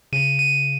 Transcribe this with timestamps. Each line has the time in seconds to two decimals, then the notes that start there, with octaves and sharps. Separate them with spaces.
0.12 C#3 D#7
0.39 D#7